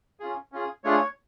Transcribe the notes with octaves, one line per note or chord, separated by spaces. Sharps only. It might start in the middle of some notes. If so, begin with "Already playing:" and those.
C#4 F4 G#4
C#4 F4 G#4
A3 D4 F4 G#4 C#5